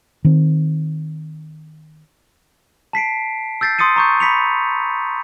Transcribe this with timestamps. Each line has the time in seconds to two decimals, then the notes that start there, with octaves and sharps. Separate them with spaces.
0.24 D#3 C4
2.93 A5 B6 C7 D7
3.61 E6 G6 A6 B6 C7
3.79 C6 D#6 A6 C#7 D#7
3.96 A#5 C#6 G6
4.20 B5 B6 C#7 F7